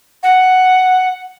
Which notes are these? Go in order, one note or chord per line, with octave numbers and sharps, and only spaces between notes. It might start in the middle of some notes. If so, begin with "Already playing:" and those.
F#5